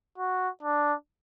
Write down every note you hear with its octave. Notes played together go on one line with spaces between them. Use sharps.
F#4
D4